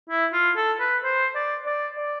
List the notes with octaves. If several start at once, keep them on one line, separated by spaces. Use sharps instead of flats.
E4
F4
A4
B4
C5
D5
D5
D5